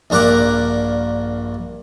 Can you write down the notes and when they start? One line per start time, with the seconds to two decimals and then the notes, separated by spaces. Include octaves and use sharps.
0.10 A#1 G2 A#4 F#5 D6